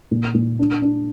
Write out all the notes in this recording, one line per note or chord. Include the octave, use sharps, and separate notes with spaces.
A#2
A#2
D4
D4